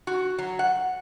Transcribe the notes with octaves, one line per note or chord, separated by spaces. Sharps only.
F#4
F#3
F#5